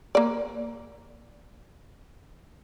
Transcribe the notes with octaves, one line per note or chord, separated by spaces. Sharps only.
A#3 D5